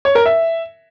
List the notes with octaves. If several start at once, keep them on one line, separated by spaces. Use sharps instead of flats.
C#5
A#4
E5